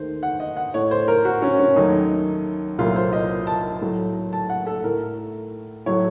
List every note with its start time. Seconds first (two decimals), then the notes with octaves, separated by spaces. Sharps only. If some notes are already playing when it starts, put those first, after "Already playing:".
Already playing: D#2 D#3 A3 C5
0.23 F#5
0.40 D#5
0.57 F#5
0.74 A2 A3 C#5
0.91 C5
1.08 A#4
1.25 F#4
1.42 C#4
1.59 C#4
1.76 D#2 D#3 F#3 A3 D#4
2.78 C2 A#2 F#3 A3 F4
2.96 C5
3.13 D#5
3.47 A5
3.81 A2 F#3 A3
4.33 A5
4.50 F#5
4.67 A4
4.84 A2 A3 A#4
5.86 A2 F#3 A3 C#5